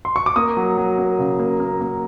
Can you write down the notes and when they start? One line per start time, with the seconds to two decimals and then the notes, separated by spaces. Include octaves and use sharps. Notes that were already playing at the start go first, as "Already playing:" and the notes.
0.05 C6
0.16 C#6
0.26 D6
0.36 A#3 D#6
0.57 F#3
0.78 F#3
0.98 A#3
1.19 C#3
1.39 A#3
1.60 A#3
1.81 A#3